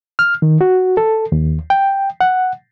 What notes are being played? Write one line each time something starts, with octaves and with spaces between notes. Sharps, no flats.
F6
D#3
F#4
A4
D#2
G5
F#5